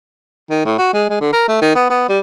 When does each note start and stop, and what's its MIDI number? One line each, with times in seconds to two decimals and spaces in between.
0.50 0.65 51
0.65 0.73 45
0.78 0.90 66
0.93 1.05 56
1.10 1.18 56
1.21 1.32 50
1.33 1.45 70
1.48 1.61 57
1.62 1.75 51
1.75 1.85 59
1.90 2.04 59
2.09 2.19 55